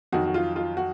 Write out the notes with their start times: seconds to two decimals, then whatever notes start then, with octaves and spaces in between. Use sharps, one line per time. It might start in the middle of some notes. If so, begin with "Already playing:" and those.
0.12 F2 D#3 F#3 F#4
0.26 F#4
0.34 F4
0.56 F4
0.77 F#4